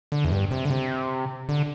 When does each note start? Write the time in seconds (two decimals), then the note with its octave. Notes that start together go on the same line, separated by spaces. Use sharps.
0.12 D3
0.25 E2
0.31 G2
0.51 C3
0.65 D3
0.71 C3
1.49 D3